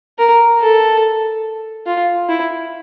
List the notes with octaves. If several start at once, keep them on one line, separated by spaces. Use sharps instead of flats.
A#4
A4
F4
E4